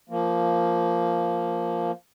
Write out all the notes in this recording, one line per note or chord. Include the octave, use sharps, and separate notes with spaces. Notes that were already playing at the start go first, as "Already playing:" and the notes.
F3 A#3